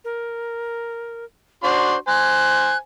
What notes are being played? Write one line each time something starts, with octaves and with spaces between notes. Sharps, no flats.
A#4
D4 F#4 C5 C6
C5 G#5 F#6